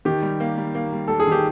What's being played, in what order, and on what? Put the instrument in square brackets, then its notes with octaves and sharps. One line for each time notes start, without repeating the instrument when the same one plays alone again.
[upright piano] D#3 [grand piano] G4
[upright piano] G3
A#3
G3
A#3
G3
[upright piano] G3 [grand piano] A4
[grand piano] G#4
[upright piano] D#3 [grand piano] G4